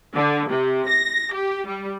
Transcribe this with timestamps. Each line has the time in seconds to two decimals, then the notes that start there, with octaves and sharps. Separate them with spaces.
0.14 D3
0.49 C3
0.89 A#6
1.33 G4
1.66 G3